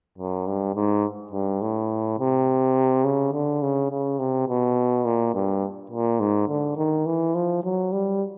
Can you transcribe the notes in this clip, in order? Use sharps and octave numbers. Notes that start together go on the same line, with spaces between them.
F#2
G2
G#2
G2
A2
C3
C#3
D3
C#3
C#3
C3
B2
A#2
G2
A#2
G#2
D3
D#3
E3
F3
F#3
G3